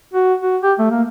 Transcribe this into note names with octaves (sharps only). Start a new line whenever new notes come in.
F#4
F#4
G4
A3
A#3